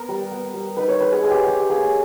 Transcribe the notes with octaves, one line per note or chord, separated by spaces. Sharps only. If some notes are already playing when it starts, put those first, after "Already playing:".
Already playing: B3 A#4
G3
B3
G3
D#4 B4
C#5
G#3 B4
G#4
G#3 G#4
G4
G#3 G4
A#3 G#4